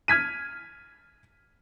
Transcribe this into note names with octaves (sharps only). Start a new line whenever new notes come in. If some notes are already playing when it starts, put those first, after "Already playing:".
F6 G#6 B6 D#7